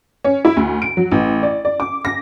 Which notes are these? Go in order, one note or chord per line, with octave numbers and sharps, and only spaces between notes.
C#4
E4
D2
D7
F#3
A1
D5
D5
D6
A#6